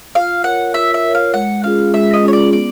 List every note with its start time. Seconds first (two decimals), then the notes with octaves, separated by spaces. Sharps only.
0.15 F4 F5
0.44 A#4 C#5 F#5
0.74 F4 E5
0.94 E5
1.04 A#4 C#5
1.15 F5
1.34 G#3 F#5
1.64 C#4 F4 G#4 F5
1.93 G#3 E5
2.13 D#5
2.23 C#4 F4 G#4 C#5
2.33 D5
2.53 B3 D5